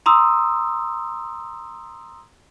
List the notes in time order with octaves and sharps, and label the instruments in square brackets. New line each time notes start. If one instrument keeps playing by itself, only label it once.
[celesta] A#5 C6 D#6 E6